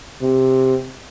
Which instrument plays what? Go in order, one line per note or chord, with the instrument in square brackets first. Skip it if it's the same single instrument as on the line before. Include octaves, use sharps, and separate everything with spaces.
[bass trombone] C3